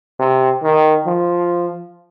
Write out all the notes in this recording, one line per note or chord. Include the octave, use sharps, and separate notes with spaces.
C3
D#3
F3